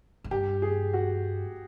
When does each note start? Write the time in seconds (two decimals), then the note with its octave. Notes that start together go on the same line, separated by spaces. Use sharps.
0.24 G#2
0.31 G2 G4
0.62 G#4
0.93 F#4